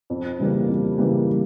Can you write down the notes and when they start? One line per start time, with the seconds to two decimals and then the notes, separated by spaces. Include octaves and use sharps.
0.10 F2
0.39 C#3 E3 G3 A#3
0.68 F2
0.97 C#3 E3 G3 A#3